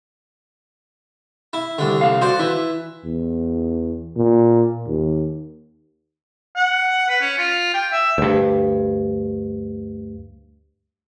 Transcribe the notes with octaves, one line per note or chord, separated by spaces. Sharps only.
E4
C2 D3
C3 G3 F5
F#4 C5 D5
E3 E4
E2
A#2
D#2
F#5
B4
C#4
F4
G5
E5
D2 G2